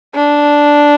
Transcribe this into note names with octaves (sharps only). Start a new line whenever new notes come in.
D4